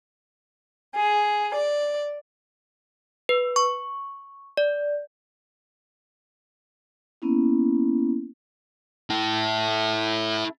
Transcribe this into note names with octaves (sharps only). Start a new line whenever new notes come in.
G#4
D5
B4
C#6
D5
A#3 B3 C#4 E4
E4 A4